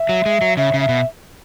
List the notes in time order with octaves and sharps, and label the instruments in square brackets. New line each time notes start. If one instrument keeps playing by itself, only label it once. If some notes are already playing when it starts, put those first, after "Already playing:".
Already playing: [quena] E5
[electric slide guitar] F#3
G#3
F#3
[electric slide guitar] C#3 [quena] E5
[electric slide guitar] C#3
[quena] E5
[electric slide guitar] B2